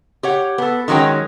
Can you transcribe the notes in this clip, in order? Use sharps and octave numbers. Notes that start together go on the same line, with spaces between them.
G4 C#5 F#5
B3 A4
D#3 F#3 G#3 C#4 G5